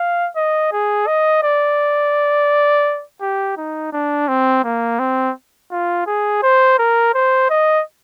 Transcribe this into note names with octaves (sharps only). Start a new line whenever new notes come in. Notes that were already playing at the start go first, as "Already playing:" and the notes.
Already playing: F5
D#5
G#4
D#5
D5
G4
D#4
D4
C4
A#3
C4
F4
G#4
C5
A#4
C5
D#5